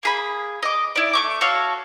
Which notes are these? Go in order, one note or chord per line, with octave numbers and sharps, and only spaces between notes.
A#3 G#4 B5
D#5 D6
E4 D5
A3 C#6 D6
F#4 A4 C#5 F5